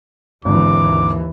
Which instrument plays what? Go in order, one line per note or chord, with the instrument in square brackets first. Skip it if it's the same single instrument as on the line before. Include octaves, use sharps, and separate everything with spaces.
[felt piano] G#1 G#2 D3 [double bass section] D#2 E3 [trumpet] D6